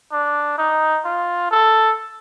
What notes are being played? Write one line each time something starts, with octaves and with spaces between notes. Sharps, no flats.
D4
D#4
F4
A4